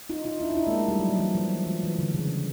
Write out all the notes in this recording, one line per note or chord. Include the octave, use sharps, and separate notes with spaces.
D#4 F4
D#4 F4
D4 E4
D#4
D4 E4
G#3 A#3
A3
G3
F#3
F3
E3
F3
E3
E3
D3
C#3